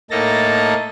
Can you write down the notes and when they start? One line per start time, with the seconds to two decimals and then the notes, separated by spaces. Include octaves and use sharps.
0.11 A2 A#3 D#4 A4 A5 A#6